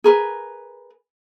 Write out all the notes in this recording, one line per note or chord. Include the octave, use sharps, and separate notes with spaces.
G#4 A#4 B4